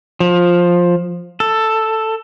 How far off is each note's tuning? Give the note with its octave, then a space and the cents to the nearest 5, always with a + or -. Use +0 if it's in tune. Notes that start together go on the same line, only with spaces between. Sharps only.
F3 +10
A4 +5